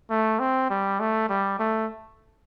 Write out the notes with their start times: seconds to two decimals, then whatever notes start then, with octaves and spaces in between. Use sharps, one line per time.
0.10 A3
0.39 C4
0.70 G3
1.00 A3
1.29 G3
1.59 A3